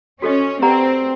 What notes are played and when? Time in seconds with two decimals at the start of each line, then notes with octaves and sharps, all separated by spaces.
0.22 C#4 F#4 A4 C5 D#5
0.62 C4 G4 B4 D5 F#5 A#5